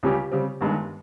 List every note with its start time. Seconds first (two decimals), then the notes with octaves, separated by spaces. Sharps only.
0.03 C#2 C#3 G3 C#4 G4
0.32 C#3 G3 C4
0.61 G1 G2 D#3 G#3